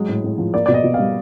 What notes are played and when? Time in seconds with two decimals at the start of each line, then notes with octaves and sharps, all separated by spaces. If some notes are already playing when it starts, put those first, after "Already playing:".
Already playing: F#3 G#3
0.09 A2
0.24 A2
0.38 F3
0.54 A#3 D5
0.66 B2 D5
0.74 D#5
0.84 B2
0.94 G3 F5